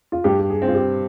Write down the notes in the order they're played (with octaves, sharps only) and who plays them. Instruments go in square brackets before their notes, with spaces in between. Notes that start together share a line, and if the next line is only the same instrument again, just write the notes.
[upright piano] F4
[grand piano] G2 [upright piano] G4
[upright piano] G4
G#4
[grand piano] C4
[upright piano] F4
G4